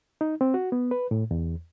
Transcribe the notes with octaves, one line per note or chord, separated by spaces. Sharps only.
D#4
C4
F#4
B3
B4
A2
E2